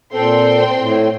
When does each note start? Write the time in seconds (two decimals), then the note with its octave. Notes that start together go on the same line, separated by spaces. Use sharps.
0.13 A#2 C4 A4 G5 C6
0.77 A2